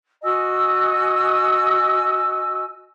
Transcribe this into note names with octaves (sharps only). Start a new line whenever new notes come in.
F#4 D#5 G#5 E6